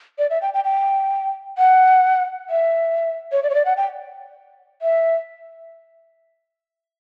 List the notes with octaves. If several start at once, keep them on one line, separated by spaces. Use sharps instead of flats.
D5
E5
G5
G5
G5
F#5
E5
C#5
D5
C#5
D5
F#5
G5
E5